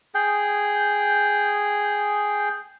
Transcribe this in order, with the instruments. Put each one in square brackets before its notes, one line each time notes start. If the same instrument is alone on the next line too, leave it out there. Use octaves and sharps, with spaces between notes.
[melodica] G#4 G5